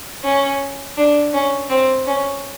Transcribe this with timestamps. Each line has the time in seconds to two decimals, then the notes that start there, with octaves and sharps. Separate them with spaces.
0.24 C#4
0.97 D4
1.34 C#4
1.70 C4
2.08 C#4